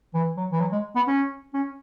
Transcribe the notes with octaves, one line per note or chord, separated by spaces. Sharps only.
E3
F#3
E3
F#3
G#3
B3
C#4
C#4